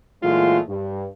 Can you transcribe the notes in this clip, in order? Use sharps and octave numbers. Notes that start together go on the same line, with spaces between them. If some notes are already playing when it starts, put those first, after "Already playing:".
A#2 E3 F#3 G#3 A3 F4
G2